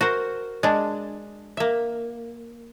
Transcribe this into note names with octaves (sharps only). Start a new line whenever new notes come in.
F#4 A#4 C5
G#3 D4
A#3 E5